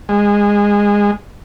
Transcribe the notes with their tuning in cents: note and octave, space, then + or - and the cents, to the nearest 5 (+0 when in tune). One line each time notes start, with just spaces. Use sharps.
G#3 -20